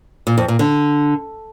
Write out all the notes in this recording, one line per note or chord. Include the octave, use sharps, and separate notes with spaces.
A#2
F2
A#2
D3